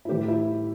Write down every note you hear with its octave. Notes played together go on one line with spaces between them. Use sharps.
E4
A2 E3 G4
E4